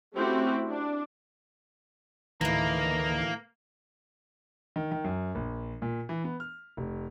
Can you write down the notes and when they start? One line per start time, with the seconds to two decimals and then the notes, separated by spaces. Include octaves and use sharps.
0.15 A3 C4 C#4 E4 F#4 G4
0.68 D4
2.41 D2 A2 D#3 E3 A#3 D#5 A#5
4.76 D#3
4.92 D#3
5.04 F#2
5.35 A#1
5.82 A#2
6.09 E3
6.24 B3
6.40 F6
6.77 F1